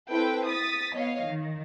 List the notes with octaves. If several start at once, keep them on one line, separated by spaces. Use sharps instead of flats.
C4 E4 A4 B4 G5
D#6 A6 B6
B3 C#5 D#5 F5
D#3